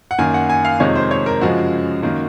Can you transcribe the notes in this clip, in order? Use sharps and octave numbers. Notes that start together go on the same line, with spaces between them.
F#5
F#2 D#3 A#3 G#5
F#5
G#5
F5
F2 C3 D#3 G#3 C#5
C5
C#5
A#4
F#2 C#3 F3 G#3 F#4
F#2 D#3 A#3